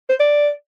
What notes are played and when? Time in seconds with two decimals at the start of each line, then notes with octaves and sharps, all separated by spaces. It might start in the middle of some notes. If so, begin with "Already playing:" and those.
0.09 C5
0.20 D5